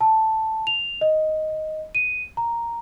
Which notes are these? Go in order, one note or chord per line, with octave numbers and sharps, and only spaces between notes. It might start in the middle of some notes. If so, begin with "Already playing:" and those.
A5
F7
D#5
D#7
A#5